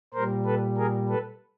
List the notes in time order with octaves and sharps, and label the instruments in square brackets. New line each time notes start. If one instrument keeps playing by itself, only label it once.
[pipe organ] A#2 G3 A#4 C5
A4 B4
G#4 A#4
A4 B4